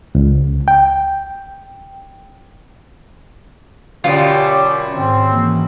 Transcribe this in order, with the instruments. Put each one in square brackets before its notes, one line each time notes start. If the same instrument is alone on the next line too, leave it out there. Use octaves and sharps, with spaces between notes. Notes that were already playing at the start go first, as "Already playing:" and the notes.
[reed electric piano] C#2
G5
[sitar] F#2 B2 [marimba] D3 [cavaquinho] F4 D5 [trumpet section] G4
[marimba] G#2 D#3 [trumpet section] C4
[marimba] E3 A#3